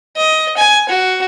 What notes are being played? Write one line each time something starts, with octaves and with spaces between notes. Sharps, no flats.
D#5
G#5
F#4